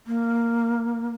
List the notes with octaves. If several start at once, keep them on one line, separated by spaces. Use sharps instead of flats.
A#3